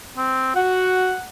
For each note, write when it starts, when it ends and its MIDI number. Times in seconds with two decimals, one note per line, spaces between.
0.17 0.52 60
0.56 1.13 66
0.56 1.27 78